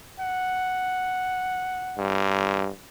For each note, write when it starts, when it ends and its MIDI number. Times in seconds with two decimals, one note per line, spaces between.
0.20 2.15 78
1.98 2.69 43